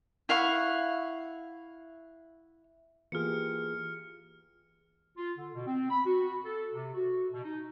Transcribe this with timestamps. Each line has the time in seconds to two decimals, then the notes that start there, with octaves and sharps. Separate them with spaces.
0.29 E4 F5 F#5 C#6
3.12 E3 A#3 F4 G4 G#4 F6 C#7
5.16 F4
5.37 D3
5.54 B2
5.66 C4
5.90 B5
6.05 F#4
6.45 A4
6.73 C3
6.94 F#4
7.32 B2
7.44 D#4